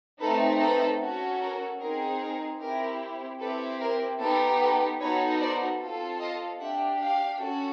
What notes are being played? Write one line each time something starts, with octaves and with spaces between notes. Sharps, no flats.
A3 C4 D#4 A4 B4
A4 B4
C#4 F#4 A4
A#4
C4 D#4 G#4 A#4
A#4
C4 E4 G4 A#4
C4 E4 G4 A4 B4
A#4
B3 D#4 G4 A4
A4 B4
B3 D#4 F#4 A4 B4 C#5
C5 D5
C4 F4 A4
D#5 F5
D4 G4 E5 F#5
F5 G5
C#4 F#4 A4